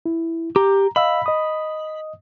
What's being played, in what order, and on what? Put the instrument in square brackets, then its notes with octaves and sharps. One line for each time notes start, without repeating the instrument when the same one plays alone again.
[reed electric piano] E4
[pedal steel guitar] G4 [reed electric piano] A#5
[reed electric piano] D#5 F5 E6 [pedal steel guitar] B5
[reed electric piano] D#5 D#6